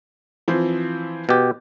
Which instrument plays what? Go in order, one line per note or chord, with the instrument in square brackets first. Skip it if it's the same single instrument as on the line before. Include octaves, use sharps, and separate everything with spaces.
[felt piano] E3 F3 C4
[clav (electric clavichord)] B2 G4